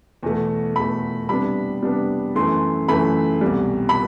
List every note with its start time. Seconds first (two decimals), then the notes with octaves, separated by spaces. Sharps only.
0.23 E2 B2 A3
0.76 E2 B2 A3 B5
1.29 C3 G3 B3 D4 B5
1.82 C3 G3 B3 D4
2.35 F#2 E3 A3 C6
2.88 F#2 E3 A3 B5
3.41 C2 B2 G3
3.89 B5